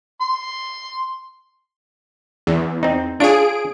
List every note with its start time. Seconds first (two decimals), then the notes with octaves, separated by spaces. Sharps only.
0.21 C6
2.47 E2
2.83 C4 D#4
3.20 D4 F4 G#4 C#5 D7